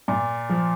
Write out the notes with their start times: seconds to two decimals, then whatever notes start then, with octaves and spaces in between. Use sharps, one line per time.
0.08 A#2
0.50 F3